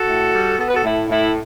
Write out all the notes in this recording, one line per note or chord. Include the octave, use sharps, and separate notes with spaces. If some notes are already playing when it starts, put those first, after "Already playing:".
Already playing: F#4 A4
A2
G3
B3 A4
B4
F#4 A4
A2 E4
A2 E4